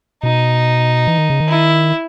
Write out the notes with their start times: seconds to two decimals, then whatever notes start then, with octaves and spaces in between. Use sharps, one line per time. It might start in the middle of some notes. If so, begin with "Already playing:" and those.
0.23 B2 D#4
1.07 E3
1.17 D#3
1.30 C#3
1.40 D#3
1.48 E4